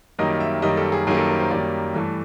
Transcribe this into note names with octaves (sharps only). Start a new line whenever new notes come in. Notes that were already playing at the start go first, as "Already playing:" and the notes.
F#2 D#3 G3 A#3 D#5
E5
F#2 D#3 G3 A#3 D#5
A4
G#4
F#2 D#3 G3 A#3 G#4
A4
A#4
C5
F#2 D#3 G3 A#3 D5
G2 E3 A3